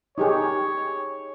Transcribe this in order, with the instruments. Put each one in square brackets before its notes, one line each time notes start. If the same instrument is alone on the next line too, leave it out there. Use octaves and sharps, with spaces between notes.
[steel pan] D#4 G4 G#4 [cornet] C#5